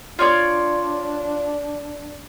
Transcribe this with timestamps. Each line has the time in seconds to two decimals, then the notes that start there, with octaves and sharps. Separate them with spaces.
0.19 D4 F4 C#5 D5